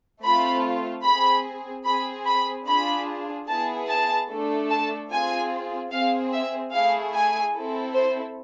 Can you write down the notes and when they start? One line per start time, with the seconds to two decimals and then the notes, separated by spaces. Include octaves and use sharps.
0.23 A3 C4 F4 B5
1.04 C4 G#4 B5
1.85 C4 G#4 B5
2.27 B5
2.67 D4 F4 G#4 B5
3.48 B3 E4 G#4 A5
3.88 A5
4.29 A3 D4 A4
4.70 A5
5.11 C4 F4 G#4 G#5
5.91 C4 G#4 F5
6.32 E5
6.73 A3 E4 G#4 F5
7.14 G#5
7.55 C4 E4 A4
7.94 C5